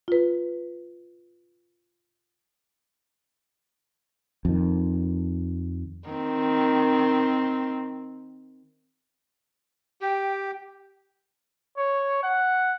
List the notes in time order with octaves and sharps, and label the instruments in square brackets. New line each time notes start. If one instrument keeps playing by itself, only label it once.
[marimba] F4 B4
[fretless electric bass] F2 D#3
[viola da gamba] D#3 C4
[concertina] G4 [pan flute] G5
[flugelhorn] C#5
F#5